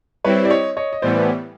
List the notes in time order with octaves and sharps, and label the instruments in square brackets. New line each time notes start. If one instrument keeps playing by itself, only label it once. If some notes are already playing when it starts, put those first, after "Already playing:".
[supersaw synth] G3 C4 E4 [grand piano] B4 C#5
[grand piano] D5
C#5 D#5
C#5 D#5
D#5
[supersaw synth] A2 E3 G3 B3 [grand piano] C5 D5